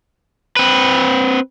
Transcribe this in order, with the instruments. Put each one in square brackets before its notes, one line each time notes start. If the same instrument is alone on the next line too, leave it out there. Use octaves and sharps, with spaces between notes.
[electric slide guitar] C4 B4